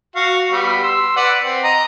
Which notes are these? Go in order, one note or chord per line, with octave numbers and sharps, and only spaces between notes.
F#4 F5
G3 B3
C6 E6
B4 D5 F#5
C4
D#5 A#5